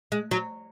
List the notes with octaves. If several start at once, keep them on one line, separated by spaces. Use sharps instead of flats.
G#3
F#3